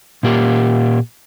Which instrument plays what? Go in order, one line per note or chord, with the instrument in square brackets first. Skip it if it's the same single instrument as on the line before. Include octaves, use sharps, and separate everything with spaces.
[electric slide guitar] A#2 A#3 G4